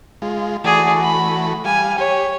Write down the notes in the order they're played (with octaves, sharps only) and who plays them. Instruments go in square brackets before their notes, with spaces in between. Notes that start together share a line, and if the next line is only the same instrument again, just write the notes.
[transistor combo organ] G#3 F4
[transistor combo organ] E3 A3 F#4 [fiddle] G#4 D5
[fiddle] B5
[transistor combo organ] G3 F5 [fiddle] G#5
[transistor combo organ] G4 [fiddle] C#5